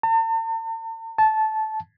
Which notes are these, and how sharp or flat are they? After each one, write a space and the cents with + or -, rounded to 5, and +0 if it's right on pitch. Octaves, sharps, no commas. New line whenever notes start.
A5 +45
A5 -15